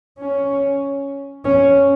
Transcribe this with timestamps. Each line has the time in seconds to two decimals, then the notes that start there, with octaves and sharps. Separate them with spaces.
0.19 C#4
1.45 C#4